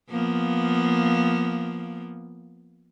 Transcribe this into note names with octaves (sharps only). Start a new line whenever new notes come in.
F3 A#3 B3